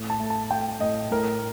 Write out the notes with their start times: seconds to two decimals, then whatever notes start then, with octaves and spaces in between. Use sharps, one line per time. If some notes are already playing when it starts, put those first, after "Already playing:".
Already playing: A2
0.10 A5
0.20 A3
0.30 A5
0.51 A3 G5
0.80 A2 D#5
1.11 A2 A#4